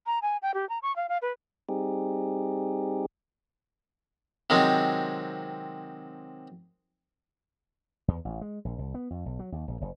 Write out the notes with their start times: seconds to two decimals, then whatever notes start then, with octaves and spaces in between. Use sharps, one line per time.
0.06 A#5
0.22 G#5
0.42 G5
0.54 G4
0.69 A#5
0.82 C#6
0.96 F5
1.09 F5
1.22 B4
1.69 G3 C4 D#4 G4 G#4
4.50 C3 D#3 F#3 G#3 C4
8.08 E2
8.25 A1
8.41 G#3
8.65 A#1
8.79 C2
8.94 B3
9.10 F2
9.26 B1
9.39 F#3
9.52 D#2
9.68 A#1
9.81 F#1